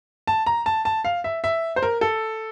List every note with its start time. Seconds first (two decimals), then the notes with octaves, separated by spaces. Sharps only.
0.27 A5
0.46 A#5
0.66 A5
0.85 A5
1.04 F5
1.24 E5
1.44 E5
1.76 C5
1.83 A#4
2.01 A4